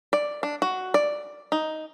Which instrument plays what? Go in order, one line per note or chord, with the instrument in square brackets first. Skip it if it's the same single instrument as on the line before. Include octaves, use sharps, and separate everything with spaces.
[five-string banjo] D5
D4
F#4
D5
D#4